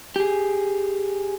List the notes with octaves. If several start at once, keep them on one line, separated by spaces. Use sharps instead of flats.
G4 G#4